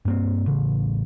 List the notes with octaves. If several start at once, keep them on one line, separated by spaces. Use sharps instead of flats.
G2 A#3 C4
A1 C#3